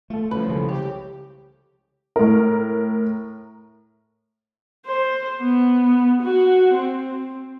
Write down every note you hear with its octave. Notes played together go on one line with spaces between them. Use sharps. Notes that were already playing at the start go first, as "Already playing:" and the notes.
A3 F4 A4
C2 F3 C#4 B4
C#3 E3 G#3 A3
G4 C#5
A2 A#4
C5
B3
F#4
C4